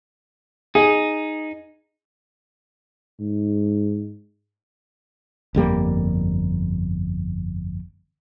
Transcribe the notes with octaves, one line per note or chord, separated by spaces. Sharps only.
D#4 G#4
G#2
G1 F2 G3 A#3